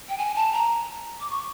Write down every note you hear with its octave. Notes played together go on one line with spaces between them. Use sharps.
G5
G#5
A5
A#5
D6
C#6